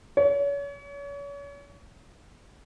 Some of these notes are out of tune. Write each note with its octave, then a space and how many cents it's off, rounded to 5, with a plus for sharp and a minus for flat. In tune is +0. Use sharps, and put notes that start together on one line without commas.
C#5 +35